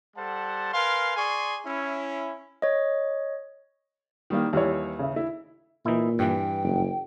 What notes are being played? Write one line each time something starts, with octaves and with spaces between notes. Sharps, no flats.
G3 A4 C5 F#5 A5
A#4 B4 F5 G#5 C6
G#4 D5 G#5 C6 C#6
C#4 E4
C#5 D#5
D#3 G3 A#3
D#2 E3 G3 C#5
C#3 E5
E4
A#2 E3 D#4 E4
G2 E3 G5
F#1